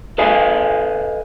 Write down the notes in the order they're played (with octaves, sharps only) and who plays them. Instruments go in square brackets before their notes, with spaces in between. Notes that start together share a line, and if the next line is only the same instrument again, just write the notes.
[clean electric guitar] A4 B4 D#5 F5 G#5